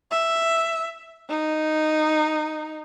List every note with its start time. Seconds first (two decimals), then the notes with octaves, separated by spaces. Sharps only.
0.11 E5
1.29 D#4